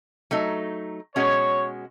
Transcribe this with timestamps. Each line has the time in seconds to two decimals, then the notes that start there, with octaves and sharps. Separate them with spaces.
0.31 F#3 A3 D#4
1.15 B2 G#3 C#4 F#4 C#5